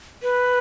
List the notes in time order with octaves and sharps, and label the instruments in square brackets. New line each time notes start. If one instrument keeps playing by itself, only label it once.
[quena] B4